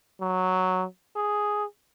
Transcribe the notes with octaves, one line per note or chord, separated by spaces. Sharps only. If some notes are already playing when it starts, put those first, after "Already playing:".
F#3
G#4